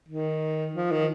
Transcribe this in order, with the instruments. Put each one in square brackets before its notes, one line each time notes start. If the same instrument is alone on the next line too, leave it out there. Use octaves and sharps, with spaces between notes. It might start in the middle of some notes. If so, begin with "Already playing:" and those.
[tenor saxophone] D#3
F3
D#3